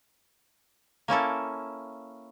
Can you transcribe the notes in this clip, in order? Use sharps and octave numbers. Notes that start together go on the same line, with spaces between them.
A#3 C#4 E4 A4